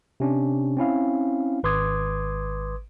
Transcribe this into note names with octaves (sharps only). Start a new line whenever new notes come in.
C3 C#4 D4
C4 C#4 E4 F5
G#1 B4 C6 D6 D#6 G#6